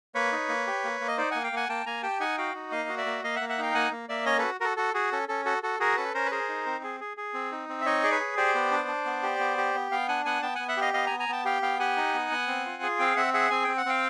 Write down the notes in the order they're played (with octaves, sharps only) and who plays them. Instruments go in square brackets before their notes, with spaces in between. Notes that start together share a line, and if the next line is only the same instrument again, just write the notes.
[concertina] A#3 B4 C#5
D#4
A#3
G4
A#3
A#3
D#5
D#4 C5 D5
A#3 F#5 G#5
F5 G5
A#3 F#5 G#5
A#3 G5 A5
A#3 G#5 A#5
G4 G5 A5
D#4 F#5 G#5
F#4 F5 G5
D#4
A#3 D#5 F5
F#4
D5 E5
A#3
A#3 D#5 F5
E5 F#5
A#3
E5 F#5
D#4 F5 G5
A#3 F#5 G#5
A#3
A#3 D5 E5
C#4 C#5 D#5
F#4 A4 B4
F#4 A4 A#4
F#4 A4
F#4 G#4
C#4 A4
C#4 A4
F#4 A4
F#4 A4
F#4 G#4 A#4
C#4 A4 B4
C#4 A#4 C5
B4
G#4 A#4 C5
D#4
C4
G#4
G#4
G#4
C4
D#4
C4
E5
D#4 C#5 D#5
G#4 D5
B4 C#5
G#4
G4 C5 D5
B3
D4
D4
B3
G4
B3
G4
B3
B3 F5 G5
D4 F#5 G#5
B3 F#5 G#5
B3 G5 A5
F#5 G#5
B3
E5 F#5
G4 D#5 F5
B3 D#5 F5
G#5 A#5
B3
G#5 A#5
B3 G5 A5
G4 F5 G5
B3 F5 G5
G4 F#5 G#5
D#4
B3
B3
C4
F4
G#4
C4 F5 G5
C4 E5 F#5
G#4 E5 F#5
C4 G#5
C4 G5
F#5
C4 F5 G5